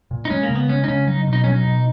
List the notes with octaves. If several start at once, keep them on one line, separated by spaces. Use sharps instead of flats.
A#2
D#4
G#3 C#4
A#3
C#3
B3
G#3 C#4
D#4
C#3 C#4
F#3 D#4
B2
D#4
F#3 C#4
D#4
B2